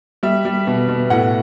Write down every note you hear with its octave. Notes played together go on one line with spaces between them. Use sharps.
G3 E5
G3
B2
B2
A2 F#5